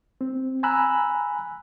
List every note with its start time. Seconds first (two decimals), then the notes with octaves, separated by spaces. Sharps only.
0.21 C4
0.63 G#5 A#5 B5 E6 F#6